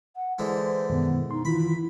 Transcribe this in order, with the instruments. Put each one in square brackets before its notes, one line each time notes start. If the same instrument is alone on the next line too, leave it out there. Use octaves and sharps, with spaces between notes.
[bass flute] F#5
[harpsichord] D3 E3 G#3 [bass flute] C5
[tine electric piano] F#2 B2 D#3 [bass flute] B3
[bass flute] D#4 [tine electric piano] C6
[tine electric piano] D#3 E3 F4 [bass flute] E4 [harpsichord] B5